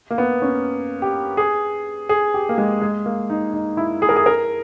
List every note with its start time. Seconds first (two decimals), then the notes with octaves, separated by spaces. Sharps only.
0.11 A#3
0.18 B3
0.42 C#4
1.02 G4
1.37 G#4
2.09 G#4
2.34 G4
2.49 A#3
2.58 G#3
2.81 G#3
3.06 A#3
3.30 D#4
3.53 D#4
3.77 E4
4.02 G#4
4.09 A#4
4.16 G#4
4.26 A#4